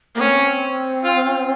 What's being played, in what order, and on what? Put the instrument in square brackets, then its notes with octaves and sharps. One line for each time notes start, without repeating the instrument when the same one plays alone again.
[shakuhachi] A#3
[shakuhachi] C4 [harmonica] C#4
[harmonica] F4